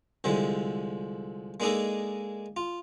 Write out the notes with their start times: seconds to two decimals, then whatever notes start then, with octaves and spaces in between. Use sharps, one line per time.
0.24 C2 D3 F3 G#3
1.60 G#3 A#3 D4 D#4 G#4 A4
2.57 F4